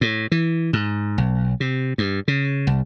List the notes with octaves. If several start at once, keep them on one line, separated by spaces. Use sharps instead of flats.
A2
E3
G#2
B1
C3
G2
C#3
C2